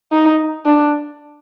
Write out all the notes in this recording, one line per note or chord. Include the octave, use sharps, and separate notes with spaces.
D#4
D4